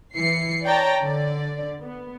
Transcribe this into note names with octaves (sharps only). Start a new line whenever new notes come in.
E3 C7 C#7
C#5 D5 G5 A5 A#5
D3 D5
B3